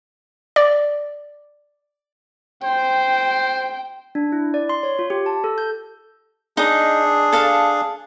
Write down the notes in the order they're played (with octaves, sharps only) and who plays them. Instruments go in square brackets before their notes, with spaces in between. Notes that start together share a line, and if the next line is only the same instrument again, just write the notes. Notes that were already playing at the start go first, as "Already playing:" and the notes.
[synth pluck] D5
[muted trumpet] C5 [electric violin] G5
[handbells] D4
E4
D5
C6
C#5
F4
G4
A5
A4
G6
[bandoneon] D4 G#4 [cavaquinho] D#4 D#5
[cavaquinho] A4 F5 A5